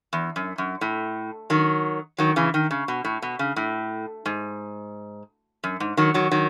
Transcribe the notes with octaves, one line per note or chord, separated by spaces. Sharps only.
E2
F#2
F#2
A2
D#3 F#3
D#3 F#3
C#3 E3
D#3
C#3
B2
A2
B2
C#3
A2
G#2
F#2
G#2
D#3 F#3
D#3 F#3
D#3 F#3